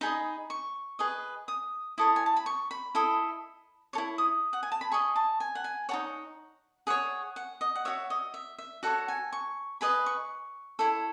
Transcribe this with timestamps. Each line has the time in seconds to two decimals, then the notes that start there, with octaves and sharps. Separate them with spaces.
0.01 D#4 G#4 D#5 B5
0.50 C#6
0.99 G#4 B4 D#5
1.48 D#6
1.98 E4 A4 C#5 D#6
2.16 G#5
2.26 A5
2.36 B5
2.46 C#6
2.71 B5
2.95 E4 A4 D#5
3.93 A4 C#5 C#6
3.98 E4
4.18 D#6
4.53 F#5
4.63 G#5
4.72 A5
4.81 B5
4.92 G#4 D#5 C#6
5.16 A5
5.40 G#5
5.55 F#5
5.64 G#5
5.89 D#4 A4 C#5 F#5
6.87 G#4 C#5 F#5
7.36 F#5
7.61 D#5
7.75 F#5
7.85 F#4 C#5 E5
8.10 D#5
8.34 E5
8.58 E5
8.83 F#4 A4 C#5 F#5
9.08 G#5
9.33 C#6
9.81 G#4 B4 D#5 B5
10.06 C#6
10.79 E4 A4 C#5